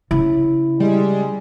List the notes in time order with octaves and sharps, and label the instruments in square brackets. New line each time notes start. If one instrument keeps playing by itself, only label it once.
[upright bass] C#3 [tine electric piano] E4
[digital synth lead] G3 [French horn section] G#3